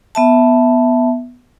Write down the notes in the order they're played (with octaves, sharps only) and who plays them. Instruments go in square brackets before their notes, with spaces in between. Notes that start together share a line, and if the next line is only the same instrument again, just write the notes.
[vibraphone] B3 E5 A5